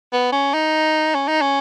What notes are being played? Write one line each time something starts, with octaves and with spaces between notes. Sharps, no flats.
B3
C#4
D#4
C#4
D#4
C#4